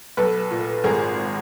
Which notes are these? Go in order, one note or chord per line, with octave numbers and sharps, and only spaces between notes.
B1 A4 B4
A#2
G#1 G#4 A#4